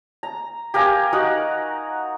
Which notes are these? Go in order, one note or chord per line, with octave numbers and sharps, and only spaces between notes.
A#5
G4 A#4 F5 G#5
D#4 F#4 A#4 F#5